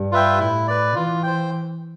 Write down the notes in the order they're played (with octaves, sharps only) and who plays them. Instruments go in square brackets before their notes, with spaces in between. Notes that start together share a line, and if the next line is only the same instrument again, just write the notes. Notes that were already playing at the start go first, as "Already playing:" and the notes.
Already playing: [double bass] G2
[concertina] F4 B4 E5 G5
[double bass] A2 [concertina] E4
[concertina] B4 D5
[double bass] E3 [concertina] F4
[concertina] C5 G5